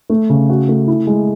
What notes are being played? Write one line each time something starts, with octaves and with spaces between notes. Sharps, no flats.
A3
C#3
F#4
A3
E4
G#3